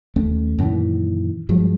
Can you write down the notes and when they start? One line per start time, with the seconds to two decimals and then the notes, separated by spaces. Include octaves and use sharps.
0.16 D#2 A3 C#4
0.59 F#2 A#2 D#3 E3
1.49 G2 F3 F#3 G#3